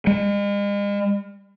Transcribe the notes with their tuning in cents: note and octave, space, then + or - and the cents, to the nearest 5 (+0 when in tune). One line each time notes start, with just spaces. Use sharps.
G#3 -40